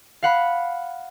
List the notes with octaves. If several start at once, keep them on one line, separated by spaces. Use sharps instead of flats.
F5 F#5 B5